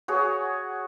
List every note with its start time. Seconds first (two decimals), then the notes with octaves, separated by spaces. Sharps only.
0.08 F#4 G#4 C#5